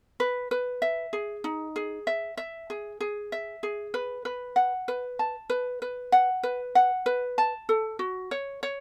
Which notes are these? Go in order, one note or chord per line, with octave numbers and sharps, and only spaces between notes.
B4
B4
E5
G#4
D#4
G#4
E5
E5
G#4
G#4
E5
G#4
B4
B4
F#5
B4
A5
B4
B4
F#5
B4
F#5
B4
A5
A4
F#4
C#5
C#5